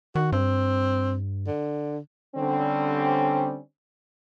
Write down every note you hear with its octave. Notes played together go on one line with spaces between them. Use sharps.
D#3 F#4
G2 C4
D3
D3 G3 C4 C#4